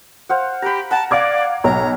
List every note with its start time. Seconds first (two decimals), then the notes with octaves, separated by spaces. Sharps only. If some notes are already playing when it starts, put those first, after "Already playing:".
0.29 C5 F5 F#5
0.62 G4 A#5 B5
0.91 F#5 A5 A#5
1.11 D5 F5 D6 G#6
1.64 B1 C#5 A#5